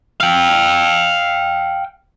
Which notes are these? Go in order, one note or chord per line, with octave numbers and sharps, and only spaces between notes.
F5 G5